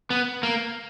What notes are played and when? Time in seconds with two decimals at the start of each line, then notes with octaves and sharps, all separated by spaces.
0.10 B3
0.43 A#3